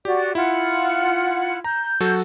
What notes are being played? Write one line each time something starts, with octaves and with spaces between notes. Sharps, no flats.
F#4 G4 D5
E4 F4 F#5
A#5 G6
F#3 F#4 A4